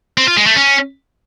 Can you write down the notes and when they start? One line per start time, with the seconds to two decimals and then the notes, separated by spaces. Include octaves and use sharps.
0.17 C4
0.27 F4
0.37 G#3
0.46 A3
0.56 C#4